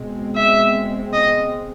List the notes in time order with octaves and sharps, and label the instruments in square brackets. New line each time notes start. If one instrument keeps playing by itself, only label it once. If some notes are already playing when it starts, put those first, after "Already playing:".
Already playing: [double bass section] B2 G#3 C4
[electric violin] E5
D#5